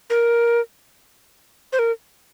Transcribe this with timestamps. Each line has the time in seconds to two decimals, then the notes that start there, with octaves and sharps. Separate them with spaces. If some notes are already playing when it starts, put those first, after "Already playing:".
0.10 A#4
1.73 C5
1.79 A#4